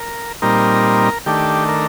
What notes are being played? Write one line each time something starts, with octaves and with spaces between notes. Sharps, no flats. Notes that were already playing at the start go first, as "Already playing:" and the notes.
Already playing: A#4
A#2 G3 C4 D#4 A#4
D#3 A3 D4 G4
A#4